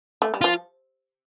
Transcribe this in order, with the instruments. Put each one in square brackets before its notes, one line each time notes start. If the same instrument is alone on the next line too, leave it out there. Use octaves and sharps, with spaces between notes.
[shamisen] A3
G3
[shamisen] F3 [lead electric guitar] F4